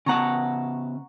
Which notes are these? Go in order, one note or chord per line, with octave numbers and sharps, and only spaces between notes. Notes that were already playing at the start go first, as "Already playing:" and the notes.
C#3 B3 F#5 A5 A#5 C#6